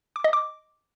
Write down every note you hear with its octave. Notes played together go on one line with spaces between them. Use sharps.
D6
D#5
D6